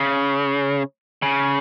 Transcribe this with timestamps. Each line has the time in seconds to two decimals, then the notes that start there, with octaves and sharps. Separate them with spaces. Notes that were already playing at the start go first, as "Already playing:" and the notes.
Already playing: C#3
1.22 C#3